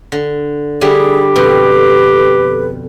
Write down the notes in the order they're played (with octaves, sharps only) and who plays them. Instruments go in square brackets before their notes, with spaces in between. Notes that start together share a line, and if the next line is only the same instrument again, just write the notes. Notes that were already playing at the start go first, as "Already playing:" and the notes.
[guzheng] D3
[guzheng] D3 G3 E4 [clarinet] G4 [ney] G#4
[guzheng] F2 B2 [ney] B4